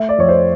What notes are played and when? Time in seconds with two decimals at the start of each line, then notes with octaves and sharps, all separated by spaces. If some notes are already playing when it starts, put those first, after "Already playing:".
Already playing: A3 E5
0.09 D5
0.18 F2 C#5
0.29 C5